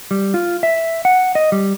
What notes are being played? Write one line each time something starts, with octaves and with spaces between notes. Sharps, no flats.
G3
F4
E5
F#5
D#5
G3